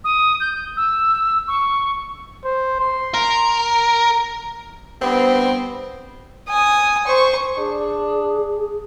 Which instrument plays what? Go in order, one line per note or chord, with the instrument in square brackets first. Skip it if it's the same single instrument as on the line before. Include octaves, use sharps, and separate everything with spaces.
[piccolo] D#6
G6
E6
C#6
[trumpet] C5
C6
[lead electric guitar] A#4
[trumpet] A#5
[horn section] G2 B3 C4
[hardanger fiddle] G#5 D#6
C5 C#6
[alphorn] D4 [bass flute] G#4